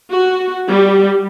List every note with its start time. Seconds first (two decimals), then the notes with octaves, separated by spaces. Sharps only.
0.12 F#4
0.68 G3